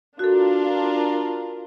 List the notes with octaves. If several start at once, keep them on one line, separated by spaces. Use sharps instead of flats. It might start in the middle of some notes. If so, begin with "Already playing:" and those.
D4 F4 F#4 A4 A#4